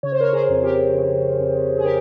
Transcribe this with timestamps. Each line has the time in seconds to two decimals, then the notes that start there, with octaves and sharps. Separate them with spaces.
0.03 C#3 C#5
0.12 C5
0.20 A#4 C#5
0.33 G#4 C5
0.49 F2
0.63 G4 A#4
0.93 C#3
1.39 F2
1.77 G#4
1.84 C#3 G4 A#4